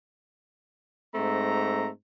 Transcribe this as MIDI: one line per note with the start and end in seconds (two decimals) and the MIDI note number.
1.15 1.88 44
1.15 1.88 57
1.15 1.88 60
1.15 1.88 82